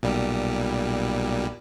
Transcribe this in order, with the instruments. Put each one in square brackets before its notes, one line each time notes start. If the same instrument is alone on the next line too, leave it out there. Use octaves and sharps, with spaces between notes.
[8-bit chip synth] B1 A#2 G3